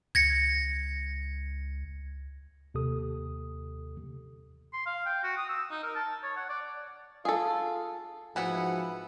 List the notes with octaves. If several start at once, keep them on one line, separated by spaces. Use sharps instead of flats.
C#2 G#6 A#6 C#7
D#2 C3 G4 A4 D#6
C6
F5
G5
F#4
D#6
E6
D#4
A#4
A5
C#5
F#5
D5
F4 G#4 A4
G#2 E3 F3 B3 E4 F#4 F#5